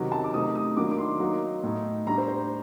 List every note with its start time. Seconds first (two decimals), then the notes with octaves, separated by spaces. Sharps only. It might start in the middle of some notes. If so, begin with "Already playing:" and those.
Already playing: C3 D#3 F#3
0.12 A5
0.24 D6
0.33 C3 D#3 A3 D#4 D#6
0.55 D#6
0.77 D#3 F#3 A#3 D4 D6
0.91 D6
0.98 C6
1.20 F#3 A#3 D#4
1.63 A2 A3 D#4
2.07 A2 G3 D4 A#5
2.18 C5
2.28 C5